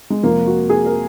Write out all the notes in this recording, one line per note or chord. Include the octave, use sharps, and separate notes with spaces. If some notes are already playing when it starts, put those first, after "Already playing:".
G#3
F2 C3 F3 A#3
F#4
G#4
A#4